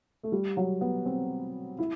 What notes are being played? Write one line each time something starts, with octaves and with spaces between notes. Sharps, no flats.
A3
G3
F#3
B3
C4
E4